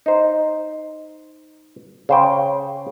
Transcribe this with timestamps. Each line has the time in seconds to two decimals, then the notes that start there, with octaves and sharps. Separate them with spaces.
0.06 D#4 C5
2.09 C#3 C5 G5